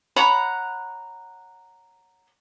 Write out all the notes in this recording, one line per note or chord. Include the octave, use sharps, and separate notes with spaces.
C#5 F#5 A#5 B5